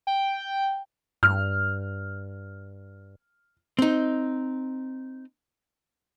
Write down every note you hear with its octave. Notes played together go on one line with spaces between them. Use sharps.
G5
G2 F6
C4 D#4